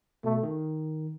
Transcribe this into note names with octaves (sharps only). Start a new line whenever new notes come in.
B2 A3
D#3